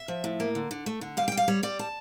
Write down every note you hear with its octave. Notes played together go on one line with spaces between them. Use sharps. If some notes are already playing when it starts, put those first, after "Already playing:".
Already playing: E5
F3
A2
A#3
D3
D3
A3
D3
G3 F5
G3 G5
F5
G3 C#5
G3 D5
A5